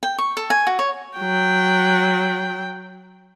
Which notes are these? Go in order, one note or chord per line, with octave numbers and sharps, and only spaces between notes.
G5
C#6
A4
G#5
F#4
C#5
F#3 G5